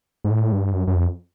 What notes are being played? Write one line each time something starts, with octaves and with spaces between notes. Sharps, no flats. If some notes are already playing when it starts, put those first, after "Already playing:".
G#2
A2
G2
F#2
F#2
F2